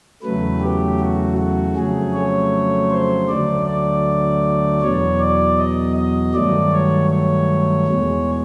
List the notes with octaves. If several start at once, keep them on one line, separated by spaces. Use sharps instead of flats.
E2 C#3 F#3 A3 B4
G4
F#4
F#4
F2 C#3 F#3 A3 G#4
C#5
C5
D2 D3 F#3 A3 D5
D5
E2 B2 F#3 C#5
D5
D#5
D#5
G2 D#3 F#3 A3 D5
C#5
C#5
E2 B2 G#3